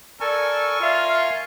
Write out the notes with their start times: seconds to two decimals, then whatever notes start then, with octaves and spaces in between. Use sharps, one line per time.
0.20 A4 A#4 D5 G#5 C#6
0.81 F4 E5 F5